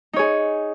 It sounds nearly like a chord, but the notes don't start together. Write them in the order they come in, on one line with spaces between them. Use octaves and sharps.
D#4 C#5 G#4